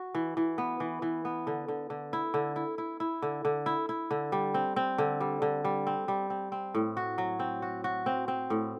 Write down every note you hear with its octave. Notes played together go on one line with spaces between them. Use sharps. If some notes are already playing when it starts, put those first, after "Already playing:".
Already playing: F#4
E3
E3
B3
E3
E3
B3
D3
D3
D3
E4
D3
E4
E4
E4
D3
D3
E4
E4
D3
G3
C4
C4
D3
G3
D3
G3
C4
G3
C4
C4
A2
F#4
F#3
C4
F#4
F#4
C4
C4
A2